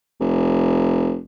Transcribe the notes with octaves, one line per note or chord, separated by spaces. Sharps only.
F1